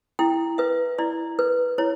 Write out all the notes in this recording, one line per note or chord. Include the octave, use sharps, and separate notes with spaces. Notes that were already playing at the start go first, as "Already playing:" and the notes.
E4 G5
B4 E5
E4 D5
B4
E4 C#5